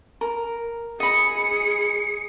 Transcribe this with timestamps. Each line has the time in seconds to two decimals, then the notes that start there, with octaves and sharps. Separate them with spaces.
0.21 A#4
1.00 G#4 D#5 B5 C#7